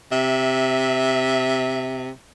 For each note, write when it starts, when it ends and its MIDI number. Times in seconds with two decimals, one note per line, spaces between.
0.12 2.10 48
0.12 2.15 76